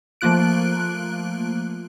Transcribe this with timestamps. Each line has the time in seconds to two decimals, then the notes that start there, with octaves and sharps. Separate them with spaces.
0.21 F3 A3 A#3 F4 F#6 D7